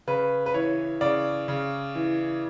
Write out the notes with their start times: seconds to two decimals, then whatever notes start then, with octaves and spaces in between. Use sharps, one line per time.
0.07 C#3 B4
0.46 B4
0.54 E3 C#5
1.01 C#3 D5
1.48 C#3
1.95 E3